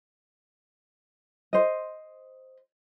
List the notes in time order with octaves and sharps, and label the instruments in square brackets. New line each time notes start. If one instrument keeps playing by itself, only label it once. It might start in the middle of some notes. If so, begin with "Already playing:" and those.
[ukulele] C5 D#5